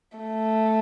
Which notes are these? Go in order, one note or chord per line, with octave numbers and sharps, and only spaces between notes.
A3